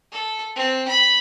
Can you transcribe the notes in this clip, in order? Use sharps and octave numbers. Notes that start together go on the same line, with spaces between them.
A4
C4
B5